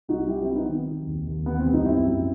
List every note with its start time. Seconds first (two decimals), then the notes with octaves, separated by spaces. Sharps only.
0.08 C2 D#4 F#4
0.28 F#3 E4 G4
0.41 C4 E4
0.47 F#3
0.55 B3 D#4
0.68 D#3 C4
0.87 F#3
1.07 D#2
1.27 D#2
1.46 E3 B3
1.59 C4
1.66 C2
1.73 B3 D#4
1.85 F#2 C4 E4
2.05 F#2